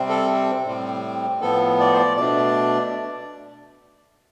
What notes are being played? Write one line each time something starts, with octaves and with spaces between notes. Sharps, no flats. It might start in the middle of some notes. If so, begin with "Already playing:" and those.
Already playing: C3 G3 C4
A4
A2 G3 C4
A2 F3 B3 A4
D5
C5
D5
B2 A3 D4 D5